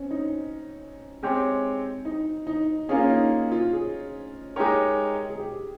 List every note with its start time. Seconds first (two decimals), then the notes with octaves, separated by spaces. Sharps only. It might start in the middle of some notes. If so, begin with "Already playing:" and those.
Already playing: C4 C#4
0.11 D#4
1.23 G#3 C4 G4 C#5
2.05 D#4
2.47 D#4
2.89 A#3 C#4 F4 G#4
3.09 D#4
3.52 F4
3.73 G#4
4.56 G#3 D#4 G4 A#4 C#5
5.30 G#4
5.40 G4